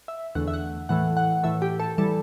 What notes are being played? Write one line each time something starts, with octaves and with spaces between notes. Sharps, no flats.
E5
E2 D3 A3 F#5
E5
F#5
A2 E3 A3 F#5
F#5
A2 E3 A3 E5
G4
A4
E3 G3 A4